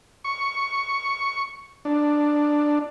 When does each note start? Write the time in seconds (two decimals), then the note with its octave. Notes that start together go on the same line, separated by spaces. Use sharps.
0.24 C#6
1.85 D4